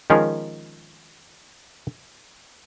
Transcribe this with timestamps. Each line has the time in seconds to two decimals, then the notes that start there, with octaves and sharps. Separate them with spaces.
0.10 D#3 F3 G#3 C#4 G#4 A#4